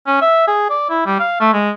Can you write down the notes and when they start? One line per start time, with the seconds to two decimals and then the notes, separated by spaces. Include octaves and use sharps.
0.07 C#4
0.21 E5
0.48 G#4
0.70 D5
0.89 E4
1.06 G3
1.19 F5
1.40 A3
1.53 G#3